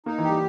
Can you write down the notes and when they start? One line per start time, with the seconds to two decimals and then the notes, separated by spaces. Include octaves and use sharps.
0.06 A#3 D#4
0.18 E3
0.24 G4
0.29 G3